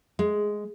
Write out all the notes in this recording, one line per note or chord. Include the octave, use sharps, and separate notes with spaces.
G#3